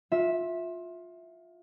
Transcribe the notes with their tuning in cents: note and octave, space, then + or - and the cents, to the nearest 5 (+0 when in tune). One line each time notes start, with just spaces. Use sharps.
F4 +20 E5 -10